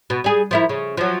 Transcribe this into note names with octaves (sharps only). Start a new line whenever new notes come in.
B2
G3 G#4
F3 E4 A#4
C#3
F3 F#3